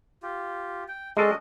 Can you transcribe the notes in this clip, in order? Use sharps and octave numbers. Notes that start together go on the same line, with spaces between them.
F4 G4
G5
G#3 C#4 D4 A4 D#5